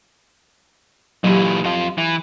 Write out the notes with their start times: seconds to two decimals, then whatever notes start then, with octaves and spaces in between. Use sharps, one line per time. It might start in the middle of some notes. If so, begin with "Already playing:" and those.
1.24 A#2 E3 F#3 G4
1.64 F2 F4
1.98 E3